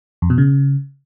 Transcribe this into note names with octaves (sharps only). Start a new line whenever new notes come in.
F2
B2
C#3